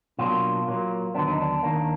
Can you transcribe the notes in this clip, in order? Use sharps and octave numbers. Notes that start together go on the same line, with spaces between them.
B2 F#3 A#3 D4 F4
A#2 F#3 A#3
D#2 D3 F#3 B3 D4
D#4
D4
D#2 D#3 A#3 D4